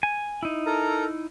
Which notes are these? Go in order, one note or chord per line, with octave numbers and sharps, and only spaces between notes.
G#5
D#4 E4
A4 A#4 A#5